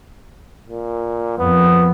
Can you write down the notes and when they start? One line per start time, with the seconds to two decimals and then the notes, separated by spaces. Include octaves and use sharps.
0.69 A#2
1.39 F2 B3